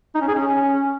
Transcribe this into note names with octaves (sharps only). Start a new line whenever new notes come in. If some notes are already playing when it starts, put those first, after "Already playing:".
D#4
C#4
G#4
C#4